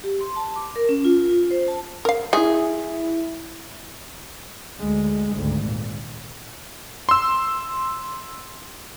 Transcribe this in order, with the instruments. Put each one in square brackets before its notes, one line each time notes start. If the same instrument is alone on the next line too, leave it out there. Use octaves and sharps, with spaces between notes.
[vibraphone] G4
C6
A5
D6
A#4
C#4
F4
F4
C5
A5
[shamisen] A#4 F5
[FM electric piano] E4 E5 [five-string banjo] G#4 [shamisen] D#5
[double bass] D2 G#3
G#1 D2
A#2
[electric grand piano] C6 E6